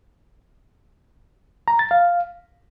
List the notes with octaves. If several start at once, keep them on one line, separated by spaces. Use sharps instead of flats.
A#5
A6
F5